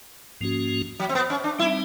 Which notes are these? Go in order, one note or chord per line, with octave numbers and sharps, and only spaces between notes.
G#2 F3 A#3 C#4 F#4
F#3
C4
B3
C#4
D4
G3 C4 D#4 E4